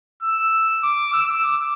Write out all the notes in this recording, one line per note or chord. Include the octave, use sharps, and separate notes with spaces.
E6
D6
E6
D6